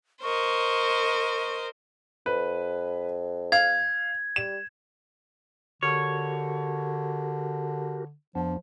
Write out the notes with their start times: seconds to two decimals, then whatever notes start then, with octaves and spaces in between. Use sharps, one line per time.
0.23 A#4 C5 D#5 C#6
2.26 F2 B4
3.52 F5 G#6
4.36 G3 E7
5.83 D3 F#4 G4 A#4 C#5
8.35 F2 F3 B3 D4